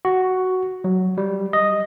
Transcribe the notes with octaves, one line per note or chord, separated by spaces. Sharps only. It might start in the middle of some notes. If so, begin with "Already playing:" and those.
F#4
F#3
G3
D#5